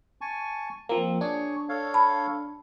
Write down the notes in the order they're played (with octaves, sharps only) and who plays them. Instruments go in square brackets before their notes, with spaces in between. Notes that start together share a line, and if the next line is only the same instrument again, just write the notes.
[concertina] G#5 A5 C#6
[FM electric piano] F3 A#3 [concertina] C4
[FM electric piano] D4 [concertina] G#4 C#5 C#6
[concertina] A4 C#5 F5
[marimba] A5 B5